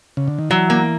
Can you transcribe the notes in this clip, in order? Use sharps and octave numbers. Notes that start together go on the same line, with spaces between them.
C#3
D3
D#3
E3 F#3
A#3